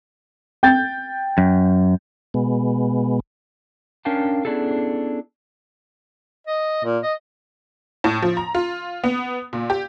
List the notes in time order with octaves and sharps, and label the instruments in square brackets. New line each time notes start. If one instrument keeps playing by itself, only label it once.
[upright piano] G5 G6 A6
[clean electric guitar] F#2
[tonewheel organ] B2 G#3 B3
[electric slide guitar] C#4 D4 A#4 F5 G5 A5
B3 C#4 D4 E4 G#4 A4
[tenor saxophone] D#5
A#2
D#5
[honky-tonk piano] A2
F3
A#5
F4
B3
A#2
G4